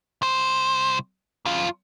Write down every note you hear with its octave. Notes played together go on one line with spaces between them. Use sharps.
C2 C5
F2 F4